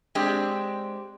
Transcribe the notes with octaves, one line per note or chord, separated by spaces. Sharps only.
G#3 C4 D4 G4